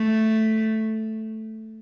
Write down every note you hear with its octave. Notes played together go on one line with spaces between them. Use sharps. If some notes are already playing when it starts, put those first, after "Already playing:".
Already playing: A3